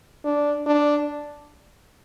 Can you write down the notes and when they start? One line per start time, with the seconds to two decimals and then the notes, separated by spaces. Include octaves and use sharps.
0.25 D4
0.67 D4